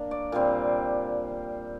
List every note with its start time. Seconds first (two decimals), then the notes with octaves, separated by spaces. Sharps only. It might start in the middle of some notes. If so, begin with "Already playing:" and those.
Already playing: A#3 D4
0.11 D5
0.32 A#2 G3 C4